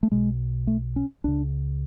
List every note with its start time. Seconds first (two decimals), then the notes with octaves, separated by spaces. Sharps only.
0.03 A3
0.12 B1 B2 G#3
0.67 A3
0.96 C#4
1.24 C#2 C#3 D4